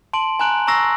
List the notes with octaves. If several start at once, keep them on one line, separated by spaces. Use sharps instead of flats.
A5 C6 D7 F#7
G#5 A#5 F#6 D7 F#7
A#5 C#6 E6 A#6 C7